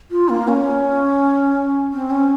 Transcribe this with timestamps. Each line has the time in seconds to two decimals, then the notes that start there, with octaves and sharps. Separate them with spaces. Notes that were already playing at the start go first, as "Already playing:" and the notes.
0.11 F4
0.29 A#3
0.48 C#4
1.93 C4
2.10 C#4